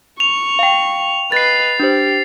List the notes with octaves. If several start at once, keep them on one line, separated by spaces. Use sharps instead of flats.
C#6 F7
F5 G5
B4 D#5 A6 C7
D4 G4 C5